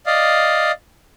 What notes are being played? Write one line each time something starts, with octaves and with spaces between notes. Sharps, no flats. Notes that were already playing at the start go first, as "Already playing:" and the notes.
D5 D#5 F5